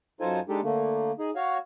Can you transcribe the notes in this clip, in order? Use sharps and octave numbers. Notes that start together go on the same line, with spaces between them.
F#2 D#4 F4 A4 C5 G#5
G#3 D4 D#4 G4 A4
D3 A3 A#3
D#4 G#4
F#4 C#5 F5